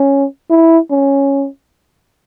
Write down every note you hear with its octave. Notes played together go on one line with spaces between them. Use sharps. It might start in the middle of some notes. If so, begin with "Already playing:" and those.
Already playing: C#4
E4
C#4